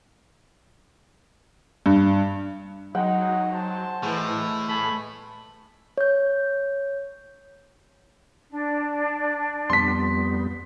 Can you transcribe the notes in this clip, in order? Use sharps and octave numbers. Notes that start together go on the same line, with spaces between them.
G2
F#3 G#3 D#4 F#5 G5
C5 A5
A2 E3 G#4 B4
A3 G#5 A5 B5
C#5 G6
D4
F2 G3 B3 C6 B6